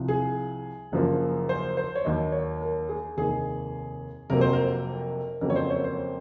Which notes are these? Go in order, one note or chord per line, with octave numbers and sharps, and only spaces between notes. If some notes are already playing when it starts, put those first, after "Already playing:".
Already playing: C2 C3 F3
G#4
F#1 F#2 F3 A#3
C5
C5
C#5
D#2 D#3 F#3 A#3 D#5
C#5
A#4
G#4
F1 D#2 D#3 A#3 G#4
F1 F2 C3 F#3 A#3 A#4
C5
A#4
F2 C#3 F#3 A#3 A#4
C#5
C5
C#5
C5